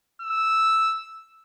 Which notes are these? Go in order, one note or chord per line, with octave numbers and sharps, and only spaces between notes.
E6